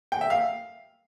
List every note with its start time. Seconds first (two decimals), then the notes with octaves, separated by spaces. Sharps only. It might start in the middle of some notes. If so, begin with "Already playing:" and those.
0.12 G5
0.21 E5
0.30 F5